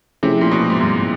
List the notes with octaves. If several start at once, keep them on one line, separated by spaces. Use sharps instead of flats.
C3 F3 A3 C#4 E4 G#4
A#2
B2
G#2
G2